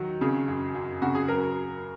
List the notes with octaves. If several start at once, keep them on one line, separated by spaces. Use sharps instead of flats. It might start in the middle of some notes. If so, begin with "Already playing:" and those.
Already playing: D#3 F#3
C#3 G#4
F#2
F#2
C#3 F#4
G#4
F#3 A#4